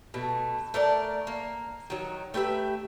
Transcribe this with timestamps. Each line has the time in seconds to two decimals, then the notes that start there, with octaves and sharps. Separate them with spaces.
0.14 B2 A3
0.74 A3 A#4 D5
1.27 A#3
1.90 D#3 F#3
2.34 A3 G4 B4 E5